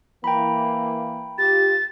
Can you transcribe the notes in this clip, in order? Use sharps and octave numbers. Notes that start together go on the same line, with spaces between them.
E3 A#3 G5 A#5 B5
F4 G4 A6